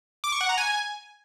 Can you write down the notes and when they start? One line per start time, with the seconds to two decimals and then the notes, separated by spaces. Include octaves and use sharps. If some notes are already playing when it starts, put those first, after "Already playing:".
0.24 D6
0.32 C#6
0.41 F#5
0.49 A#5
0.58 G#5